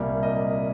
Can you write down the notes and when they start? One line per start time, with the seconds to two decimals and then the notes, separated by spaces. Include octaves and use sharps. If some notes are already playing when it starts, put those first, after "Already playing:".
Already playing: C2 A#2 G3 A#3
0.23 D#5